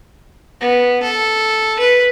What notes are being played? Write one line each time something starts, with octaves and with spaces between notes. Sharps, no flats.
B3
A4
B4